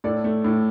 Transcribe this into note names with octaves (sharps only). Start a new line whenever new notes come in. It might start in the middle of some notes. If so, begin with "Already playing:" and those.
A2 A4 D5
A3
A2